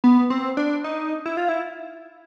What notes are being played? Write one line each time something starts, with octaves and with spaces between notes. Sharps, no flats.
B3
C4
D4
D#4
E4
F4
E4